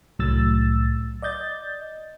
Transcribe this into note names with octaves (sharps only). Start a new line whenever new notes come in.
C2 A2 F#3 E6 A6
D5 D#5 G6 A6